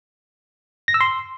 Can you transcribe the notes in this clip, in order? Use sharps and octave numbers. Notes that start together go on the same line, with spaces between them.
A#6
E6
C6